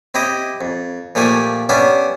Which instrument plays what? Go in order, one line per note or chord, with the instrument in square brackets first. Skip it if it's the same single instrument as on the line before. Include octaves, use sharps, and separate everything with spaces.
[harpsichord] C4 E4 G4 D#5
F2
A#2 F3 A3 G4 G#5
B3 C#4 D4 G4 E5